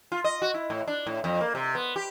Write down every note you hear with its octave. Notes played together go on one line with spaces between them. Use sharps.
F4
D#5
F#4
E4
A2
D4
A2
F2
A#3
C3
B3
G4